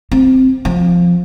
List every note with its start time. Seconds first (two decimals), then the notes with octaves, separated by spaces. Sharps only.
0.11 C4
0.65 F3